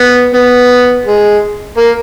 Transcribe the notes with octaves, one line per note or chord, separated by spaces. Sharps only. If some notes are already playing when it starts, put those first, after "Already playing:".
Already playing: B3
B3
G#3
A#3